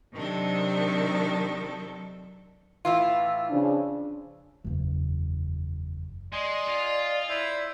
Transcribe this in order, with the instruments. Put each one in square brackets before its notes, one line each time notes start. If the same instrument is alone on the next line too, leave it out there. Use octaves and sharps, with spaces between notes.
[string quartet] C3 D#3 F#3 C4 D4 A4
[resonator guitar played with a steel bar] A2 E3 F4
[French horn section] C#3 F3 D4
[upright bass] F#1 E2
[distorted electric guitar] G#3 [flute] D5 [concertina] D#5 G#5 [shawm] C6
[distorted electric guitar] F4
[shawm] E4 [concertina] C5 E5